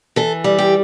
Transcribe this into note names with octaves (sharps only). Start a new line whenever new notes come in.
E3 A4
G3
G4